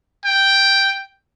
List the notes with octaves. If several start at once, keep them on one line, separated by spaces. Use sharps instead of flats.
G5